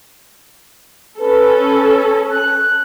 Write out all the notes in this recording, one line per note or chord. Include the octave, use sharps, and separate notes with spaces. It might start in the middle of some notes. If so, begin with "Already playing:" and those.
C#4 A4 B4
F#6